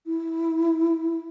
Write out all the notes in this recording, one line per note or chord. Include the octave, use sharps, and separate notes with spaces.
E4